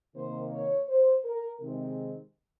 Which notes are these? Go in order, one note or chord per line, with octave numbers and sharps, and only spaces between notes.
C3 D#3 A#3 C5
C#5
C5
A#4
C3 D#3 G#3 C4